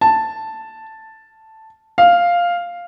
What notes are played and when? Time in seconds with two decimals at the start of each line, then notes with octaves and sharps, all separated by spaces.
0.01 A5
1.98 F5